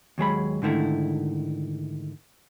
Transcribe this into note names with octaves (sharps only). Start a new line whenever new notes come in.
D#2 F#3 G#3 B5
G#2 D3 D#3 A3 E4